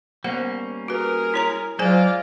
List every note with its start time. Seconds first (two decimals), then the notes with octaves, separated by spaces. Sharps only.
0.24 G3 A#3 B3 C#4 C5 F#5
0.88 F#4 G#4 A#4 B4
1.34 E4 C#5 A#5
1.79 F#3 G#3 F4 G#4 C5 D5 G#5